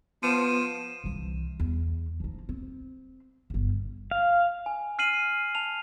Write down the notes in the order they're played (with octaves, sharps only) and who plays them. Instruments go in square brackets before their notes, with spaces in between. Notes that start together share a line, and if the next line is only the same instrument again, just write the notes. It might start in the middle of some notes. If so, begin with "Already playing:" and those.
[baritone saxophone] F3 [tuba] B3 [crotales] D#7 E7
[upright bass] C2 E3
E2
F3 D#4
C4
G1 C#3
[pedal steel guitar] F5
[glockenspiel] G#5
F6 C7 D#7 F#7
A5 F7